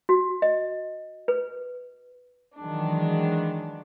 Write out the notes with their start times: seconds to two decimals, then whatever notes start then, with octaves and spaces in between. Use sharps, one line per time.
0.09 F#4
0.42 D#5
1.28 B4
2.59 D#3 E3 F#3 G#3 D4